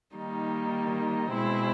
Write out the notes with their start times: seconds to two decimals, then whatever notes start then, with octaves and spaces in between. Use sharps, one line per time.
0.15 D#3 G3 A#3 D#4
1.33 B2 G#3 C4 E4